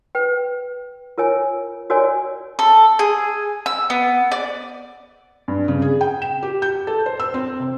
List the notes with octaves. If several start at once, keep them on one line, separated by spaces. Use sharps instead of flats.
B4 G5
F4 A#4 C#5 G#5
F#4 A#4 C#5 D5 G#5
A4
G#4
E6
B3
D5
G2
C#3
G#4
G5
E7
G4
G6
A4
C5
E6
C4
C3